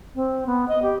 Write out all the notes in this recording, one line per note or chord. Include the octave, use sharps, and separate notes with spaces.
C4
B3
D#5
G4